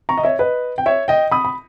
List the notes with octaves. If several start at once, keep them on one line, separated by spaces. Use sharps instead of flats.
A#5 C#6
D#5
C#5 E5
B4 D#5
G5
C#5 E5
D#5 G5
B5 D#6
B5